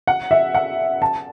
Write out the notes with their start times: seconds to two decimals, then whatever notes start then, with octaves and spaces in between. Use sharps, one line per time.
0.07 F#5
0.31 E5
0.54 F#5
1.02 A5